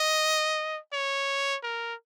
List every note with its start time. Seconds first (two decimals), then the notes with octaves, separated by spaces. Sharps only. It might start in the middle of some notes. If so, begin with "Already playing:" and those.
Already playing: D#5
0.93 C#5
1.63 A#4